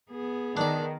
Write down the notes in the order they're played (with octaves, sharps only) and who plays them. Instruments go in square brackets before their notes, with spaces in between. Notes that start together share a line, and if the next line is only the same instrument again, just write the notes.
[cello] B3 G#4
[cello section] D#3 [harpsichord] D4 D5